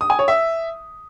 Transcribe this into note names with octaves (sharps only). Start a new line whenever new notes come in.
D#6
G#5
C#5
E5